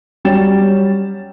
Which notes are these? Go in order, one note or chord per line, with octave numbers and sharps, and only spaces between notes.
F#3 G3 C#4 G5 A6 E7